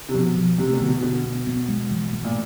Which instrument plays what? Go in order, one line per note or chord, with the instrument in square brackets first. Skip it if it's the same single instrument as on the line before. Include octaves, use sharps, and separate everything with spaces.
[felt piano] C3
[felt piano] B2 [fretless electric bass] F3
[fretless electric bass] F3
[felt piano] C3 [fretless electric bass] A3
[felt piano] B2
[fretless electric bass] D3
[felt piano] B2
[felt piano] B2 [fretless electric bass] D4
[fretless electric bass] B3
B3
G#3
E3
A3
[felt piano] A#2